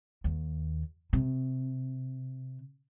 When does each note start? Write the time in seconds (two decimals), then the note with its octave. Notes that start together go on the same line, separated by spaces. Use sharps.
0.24 D#2
1.13 C3